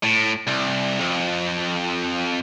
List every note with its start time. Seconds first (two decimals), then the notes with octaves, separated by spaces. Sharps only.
0.04 A2
0.47 C2
1.00 F2